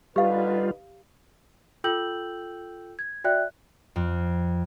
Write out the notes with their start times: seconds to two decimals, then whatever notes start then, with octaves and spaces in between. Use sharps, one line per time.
0.16 D3 G3 D#4 F4 G4 B4 F5
1.84 F4 A4 G5 E6 G6 F#7
2.99 G#6
3.24 F#4 D5 E5 G5 F#6
3.96 F2